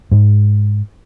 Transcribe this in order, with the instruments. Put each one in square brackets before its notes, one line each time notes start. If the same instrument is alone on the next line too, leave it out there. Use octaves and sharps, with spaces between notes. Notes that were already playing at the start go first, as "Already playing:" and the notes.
[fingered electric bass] G#2 G#3